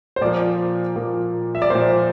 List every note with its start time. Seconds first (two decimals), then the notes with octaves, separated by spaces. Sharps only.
0.16 C5
0.21 A#2 F3 A#3 D5
0.96 A#2 F3 A#3
1.55 E5
1.62 D5
1.70 A#2 F3 A#3 C5